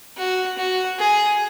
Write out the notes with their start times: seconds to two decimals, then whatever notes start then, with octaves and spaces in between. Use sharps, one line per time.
0.17 F#4
0.58 F#4
0.99 G#4